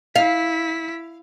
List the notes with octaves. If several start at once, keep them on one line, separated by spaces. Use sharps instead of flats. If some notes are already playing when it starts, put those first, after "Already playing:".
E4 F5 B6